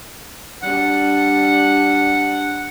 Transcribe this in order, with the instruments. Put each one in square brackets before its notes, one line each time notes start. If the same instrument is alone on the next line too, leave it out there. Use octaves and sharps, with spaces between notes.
[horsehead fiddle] G3 D4 [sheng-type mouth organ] F#5